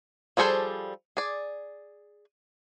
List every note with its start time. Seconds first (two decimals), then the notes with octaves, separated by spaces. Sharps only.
0.37 F3 G3 G#4 A4 C5
1.17 G#4 D5